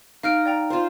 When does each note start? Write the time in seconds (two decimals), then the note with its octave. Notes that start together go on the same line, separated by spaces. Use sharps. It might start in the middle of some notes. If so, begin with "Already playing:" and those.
0.23 D#4 F5 F6 D7
0.46 D5 G5 A#5
0.70 F4 C5